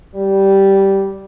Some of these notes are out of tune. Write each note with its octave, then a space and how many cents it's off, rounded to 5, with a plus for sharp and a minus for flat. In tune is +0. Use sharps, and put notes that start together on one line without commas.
G3 -10